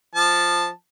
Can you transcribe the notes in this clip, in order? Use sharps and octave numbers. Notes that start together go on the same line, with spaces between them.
F3 A5